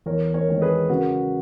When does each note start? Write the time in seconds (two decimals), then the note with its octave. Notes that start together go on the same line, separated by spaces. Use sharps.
0.06 E2 A#4 C#5
0.34 A#4 C#5
0.48 D#3 G#3 C#5
0.61 G#4 B4
0.89 C#3 F#4 A#4